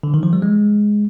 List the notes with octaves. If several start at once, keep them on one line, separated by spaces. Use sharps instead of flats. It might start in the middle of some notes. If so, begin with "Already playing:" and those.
D3
D#3
F3
G3
G#3